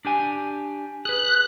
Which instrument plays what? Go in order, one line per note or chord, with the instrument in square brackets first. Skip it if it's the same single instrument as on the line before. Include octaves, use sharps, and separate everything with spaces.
[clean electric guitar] D4 G4 G#5
[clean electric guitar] G#4 B4 [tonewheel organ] F#6